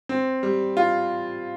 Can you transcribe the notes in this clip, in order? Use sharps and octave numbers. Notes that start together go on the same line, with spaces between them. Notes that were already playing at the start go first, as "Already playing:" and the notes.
C4
G3
F4